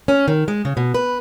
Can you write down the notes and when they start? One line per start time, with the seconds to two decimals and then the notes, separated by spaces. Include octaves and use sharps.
0.08 C#4
0.28 D#3
0.48 G#3
0.65 C#3
0.77 B2
0.94 B4